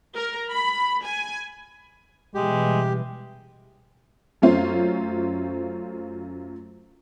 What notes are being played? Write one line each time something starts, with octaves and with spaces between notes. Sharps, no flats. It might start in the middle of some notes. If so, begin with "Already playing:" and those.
A#4
B5
G#5
B2 E3 G3 G#3 G4
F#2 A3 C#4 F4 C5